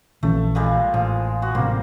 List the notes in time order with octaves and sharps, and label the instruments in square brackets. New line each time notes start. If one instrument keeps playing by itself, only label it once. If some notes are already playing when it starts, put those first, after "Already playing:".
[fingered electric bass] A#1 E3 C#4 [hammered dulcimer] A3
[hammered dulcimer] A#2 G3 G#3
[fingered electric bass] A1 [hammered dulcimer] F3
[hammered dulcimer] F#4
[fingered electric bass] A1 C3 [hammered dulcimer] G3 A#3 C5